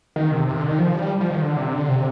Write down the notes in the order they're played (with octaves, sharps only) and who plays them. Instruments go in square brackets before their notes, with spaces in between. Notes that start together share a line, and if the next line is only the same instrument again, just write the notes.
[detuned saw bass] D#3
C3
C3
D3
D#3
F3
G3
F3
D#3
D3
C3
D3
C3